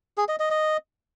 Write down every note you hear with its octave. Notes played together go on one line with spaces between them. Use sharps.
G#4
D#5
D#5
D#5